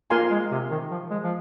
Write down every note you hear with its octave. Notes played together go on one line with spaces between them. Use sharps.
A#3 F4 A#4 F5 G#5 C6
G#3
C3
D#3
F3
G#3
F3